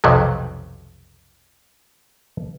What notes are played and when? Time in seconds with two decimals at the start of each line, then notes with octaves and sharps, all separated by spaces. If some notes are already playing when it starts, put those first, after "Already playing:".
0.04 B1 F2 C3 D#3 F#3